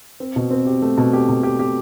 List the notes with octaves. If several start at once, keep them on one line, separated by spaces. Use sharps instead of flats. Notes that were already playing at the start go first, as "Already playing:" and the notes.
C4
B2
C4
G4
A3
B2
G4
B2
G4
G4